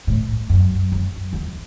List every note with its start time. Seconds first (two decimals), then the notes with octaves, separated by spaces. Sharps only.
0.07 A2
0.49 F#2
0.92 F#2
1.33 E2